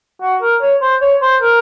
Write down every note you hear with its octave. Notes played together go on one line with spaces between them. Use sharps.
F#4
A#4
C#5
C5
C#5
C5
A#4